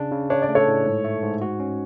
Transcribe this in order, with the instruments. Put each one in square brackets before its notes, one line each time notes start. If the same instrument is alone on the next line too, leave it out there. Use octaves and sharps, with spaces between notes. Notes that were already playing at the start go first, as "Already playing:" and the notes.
Already playing: [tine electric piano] C#3 D4
C#3
[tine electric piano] D4 [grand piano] C#5
[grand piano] D5
[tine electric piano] A3
[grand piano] A4 C#5
[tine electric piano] A2
G#2
A3
G#2
F#4
C#4